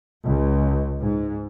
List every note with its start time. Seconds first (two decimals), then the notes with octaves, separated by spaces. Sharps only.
0.24 C#2
1.01 G#2